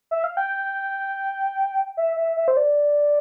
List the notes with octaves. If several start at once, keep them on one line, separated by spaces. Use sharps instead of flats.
E5
F5
G5
E5
E5
E5
C5
D5